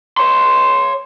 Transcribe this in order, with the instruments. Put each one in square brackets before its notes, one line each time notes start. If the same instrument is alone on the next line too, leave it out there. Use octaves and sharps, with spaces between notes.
[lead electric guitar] C#5 C6